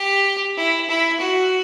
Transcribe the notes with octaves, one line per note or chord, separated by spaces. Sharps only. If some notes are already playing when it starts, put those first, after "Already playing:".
Already playing: G4
E4
E4
F#4